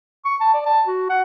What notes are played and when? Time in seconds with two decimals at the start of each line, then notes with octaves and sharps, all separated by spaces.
0.25 C#6
0.40 A5
0.54 D5
0.66 A5
0.87 F#4
1.10 F#5